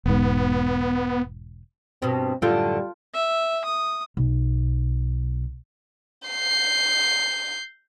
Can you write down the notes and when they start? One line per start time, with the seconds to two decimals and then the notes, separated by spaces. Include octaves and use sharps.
0.06 E1 G#2 B3
2.02 G2 B2 C4
2.42 F#2 A2 D3 G3 F4 A4 G5
3.14 E5
3.64 D#6
4.17 B1
6.28 G6 C7